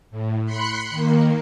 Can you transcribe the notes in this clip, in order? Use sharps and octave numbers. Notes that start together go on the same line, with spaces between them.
A2
B5 C6 F#6 C#7
D#3 A#3